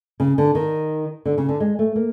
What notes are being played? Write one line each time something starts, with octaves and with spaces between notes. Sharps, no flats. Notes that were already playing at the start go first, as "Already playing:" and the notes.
C#3
D3
D#3
D3
C#3
D3
G#3
A3
A#3